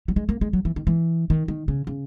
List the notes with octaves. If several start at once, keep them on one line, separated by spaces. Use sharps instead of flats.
F#3
G#3
A#3
G#3
F#3
E3
D#3
E3
D#3
D#3
C#3
C#3